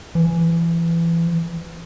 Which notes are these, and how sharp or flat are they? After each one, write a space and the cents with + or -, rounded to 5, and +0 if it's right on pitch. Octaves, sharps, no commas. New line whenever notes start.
E3 +25